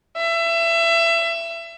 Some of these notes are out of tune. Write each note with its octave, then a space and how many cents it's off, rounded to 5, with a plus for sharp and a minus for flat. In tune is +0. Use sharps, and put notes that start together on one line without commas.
E5 +25